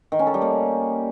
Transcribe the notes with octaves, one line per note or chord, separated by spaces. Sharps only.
D#3
C#4
A4
G3
A#3